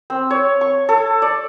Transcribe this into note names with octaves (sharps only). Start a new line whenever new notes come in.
C4
C#5
C#6
A4
D5